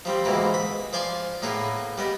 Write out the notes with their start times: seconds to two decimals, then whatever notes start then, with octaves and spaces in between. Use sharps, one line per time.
0.05 F3 G3 C4
0.25 D2 G#2 B2 E3 A#3
0.54 B5
0.93 F3 D5 G#5 C6
1.42 A2 A#3 B3 G#4
1.98 G3 B3 D#5